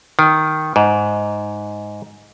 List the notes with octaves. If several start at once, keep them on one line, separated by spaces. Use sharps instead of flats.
D#3
G#2